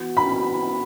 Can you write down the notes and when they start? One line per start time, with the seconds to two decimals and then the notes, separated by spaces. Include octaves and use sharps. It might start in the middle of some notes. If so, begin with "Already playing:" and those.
Already playing: E3 B3 F#4
0.17 B5